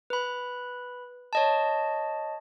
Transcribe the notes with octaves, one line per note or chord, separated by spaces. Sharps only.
B4 B5
C#5 D#5 A5